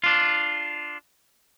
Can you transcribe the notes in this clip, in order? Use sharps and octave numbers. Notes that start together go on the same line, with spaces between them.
D4 F4